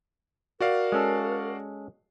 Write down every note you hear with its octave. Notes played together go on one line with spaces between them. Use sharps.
F#4 A#4 D5 F5
G#3 C#4 A4